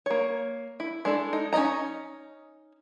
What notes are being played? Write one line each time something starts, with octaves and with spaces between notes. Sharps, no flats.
A#3 C#5
E4
G#3 D4 A4
D#4
C#4 D#4 D5 D#5 A#5